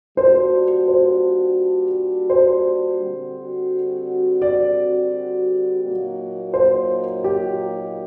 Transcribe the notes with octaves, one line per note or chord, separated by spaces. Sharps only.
A#2 G3 D4 F#4 C5
C5
C5
D3 G3 C4 F#4
D5
A#2 F#3 A#3 D#4 F#4
C5
G4